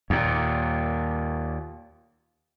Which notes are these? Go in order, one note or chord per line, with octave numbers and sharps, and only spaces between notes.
D#2 A#2